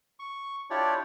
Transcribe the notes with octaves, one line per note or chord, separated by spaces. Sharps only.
C#6
D4 E4 F4 G4 C#5 D5